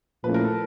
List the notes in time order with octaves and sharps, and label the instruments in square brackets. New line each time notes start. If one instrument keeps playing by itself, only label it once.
[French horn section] A#2 F3 A3 C#4 E4 [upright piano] B4
[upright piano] A#4
A4